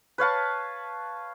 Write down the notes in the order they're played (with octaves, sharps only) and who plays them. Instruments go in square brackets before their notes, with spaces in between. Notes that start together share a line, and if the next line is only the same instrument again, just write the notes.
[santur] B4 C#5 F5 A5